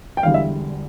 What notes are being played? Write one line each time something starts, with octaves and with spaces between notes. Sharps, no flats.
G5
E1 E2 D3 G3 F5
E5